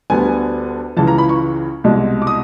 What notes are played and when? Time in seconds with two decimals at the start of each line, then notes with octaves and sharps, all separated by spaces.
0.10 D2 D3 G3 B3 G#5
0.96 C#2 C#3 E3 A5
1.08 A#5
1.18 B5
1.29 C#6
1.84 C2 B2 G#3
2.22 D6
2.27 D#6